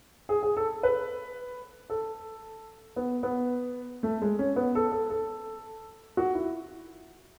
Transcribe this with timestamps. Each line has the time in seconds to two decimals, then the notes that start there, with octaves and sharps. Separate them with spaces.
0.29 G#4
0.43 G#4
0.57 A4
0.83 B4
1.90 A4
2.96 B3
3.23 B3
4.03 A3
4.22 G#3
4.39 C#4
4.56 B3
4.75 A4
4.92 A4
5.10 A4
6.17 F#4
6.35 E4